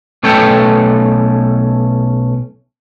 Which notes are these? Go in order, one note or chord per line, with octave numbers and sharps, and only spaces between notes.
B1 A3 C#4 A4 G5